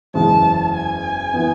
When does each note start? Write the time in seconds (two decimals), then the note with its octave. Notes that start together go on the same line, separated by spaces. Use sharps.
0.14 F#1 E2 C#3 E3 G#3 A5
0.74 G#5
1.34 E3 B3